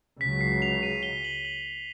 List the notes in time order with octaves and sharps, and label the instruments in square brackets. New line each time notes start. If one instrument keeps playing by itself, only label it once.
[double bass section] C#2 C#3 F#3 [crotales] B6
[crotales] C7
F7
D#7
G7
F#7
F#7